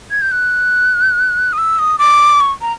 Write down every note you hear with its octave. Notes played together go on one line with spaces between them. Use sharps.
G#6
G6
F#6
D#6
E6
D#6
D6
C#6
A#5